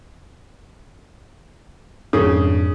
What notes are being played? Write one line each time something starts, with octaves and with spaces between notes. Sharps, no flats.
F2 G#2 C#3 D4